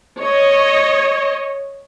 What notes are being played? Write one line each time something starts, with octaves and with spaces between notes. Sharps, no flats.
C#5 D#5